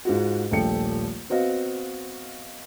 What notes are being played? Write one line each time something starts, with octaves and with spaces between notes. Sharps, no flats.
G#2 F4 F#4
D#1 A#1 A3 G5 C#7
B3 C4 F#4 D#5 F5